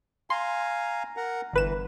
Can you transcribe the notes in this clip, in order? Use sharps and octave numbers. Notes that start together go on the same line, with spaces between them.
F5 G#5 A#5 C6
A#4 F#5 A#5
G1 E3 B4 E7